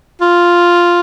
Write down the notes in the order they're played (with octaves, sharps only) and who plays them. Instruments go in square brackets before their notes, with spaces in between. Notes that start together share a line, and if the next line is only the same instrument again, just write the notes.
[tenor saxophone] F4